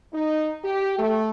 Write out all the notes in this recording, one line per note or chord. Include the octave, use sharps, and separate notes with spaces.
D#4
G4
A3